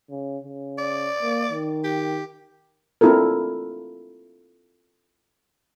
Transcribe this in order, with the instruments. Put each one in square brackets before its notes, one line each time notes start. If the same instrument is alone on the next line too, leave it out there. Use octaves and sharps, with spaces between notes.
[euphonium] C#3
C#3
[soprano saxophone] D5
[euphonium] A#3
D#3
[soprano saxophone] G4
[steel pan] C4 D4 E4 F4 A4 A#4